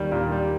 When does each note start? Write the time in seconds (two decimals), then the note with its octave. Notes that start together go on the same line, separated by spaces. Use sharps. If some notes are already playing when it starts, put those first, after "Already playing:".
Already playing: D#2 D#3 G3
0.12 A#2
0.32 G3